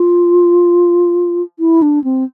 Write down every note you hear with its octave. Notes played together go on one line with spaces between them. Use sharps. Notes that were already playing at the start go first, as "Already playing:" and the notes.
Already playing: F4
E4
D4
C4